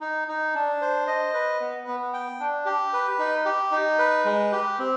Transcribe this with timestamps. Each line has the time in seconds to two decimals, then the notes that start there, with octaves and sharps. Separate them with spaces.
0.01 D#4
0.28 D#4
0.55 D4
0.81 C5
1.07 D#5
1.34 B4
1.61 B3
1.87 B3
2.14 G5
2.40 D4
2.66 G4
2.93 B4
3.19 D#4
3.45 G4
3.72 D#4
3.99 B4
4.25 G#3
4.52 G4
4.79 C4